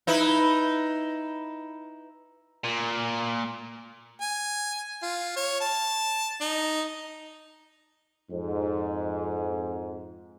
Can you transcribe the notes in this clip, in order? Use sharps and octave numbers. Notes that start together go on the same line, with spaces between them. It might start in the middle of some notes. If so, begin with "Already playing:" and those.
D#4 E4 B4
A#2
G#5
F4
C#5
A5
D#4
F2 G#2